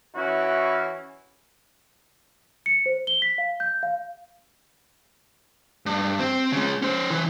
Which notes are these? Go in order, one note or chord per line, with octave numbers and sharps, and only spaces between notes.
E3 C#4 E4 F#4
C#7
C5
G7
B6
F5
G6
F5
G2
C4
C#3 G#3
C#4 C5
C2 E3